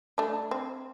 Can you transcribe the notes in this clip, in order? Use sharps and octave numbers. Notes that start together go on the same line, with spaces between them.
A3 D4
C4